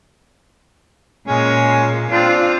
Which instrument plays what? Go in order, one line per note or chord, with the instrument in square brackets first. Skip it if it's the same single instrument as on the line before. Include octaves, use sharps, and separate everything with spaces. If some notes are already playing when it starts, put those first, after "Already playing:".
[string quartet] A#2 [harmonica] G#3 C#4
[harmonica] C4 D4 [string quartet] F4